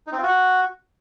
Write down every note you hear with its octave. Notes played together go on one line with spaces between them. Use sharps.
D#4
C4
F4
F#4